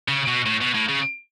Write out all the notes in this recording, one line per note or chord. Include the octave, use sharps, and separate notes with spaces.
C#3
B2
A2
B2
A2
C#3